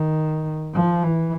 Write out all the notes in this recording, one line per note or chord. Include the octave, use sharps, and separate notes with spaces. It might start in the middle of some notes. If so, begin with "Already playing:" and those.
Already playing: D#3
F3
E3